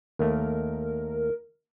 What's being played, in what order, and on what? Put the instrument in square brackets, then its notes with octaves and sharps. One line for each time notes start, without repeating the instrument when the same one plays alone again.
[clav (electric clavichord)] D#2 A3 [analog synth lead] A#4